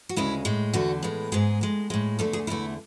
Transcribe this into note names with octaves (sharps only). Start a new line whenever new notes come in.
F#4
D2 C#3 G#3 E4
A2 G#3
E2 D3 A3 F#4
A2 E3 G#3
G#2 G#3 G#4
A2 G#3
A2 G#3
E2 D3 A3 A4
G#4
E2 D3 A3 E4